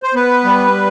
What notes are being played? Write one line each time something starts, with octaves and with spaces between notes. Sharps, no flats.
C5
B3 B4
G3